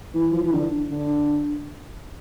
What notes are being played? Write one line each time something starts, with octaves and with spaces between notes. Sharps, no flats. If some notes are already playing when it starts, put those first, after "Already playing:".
E3
F3
E3
D3
D3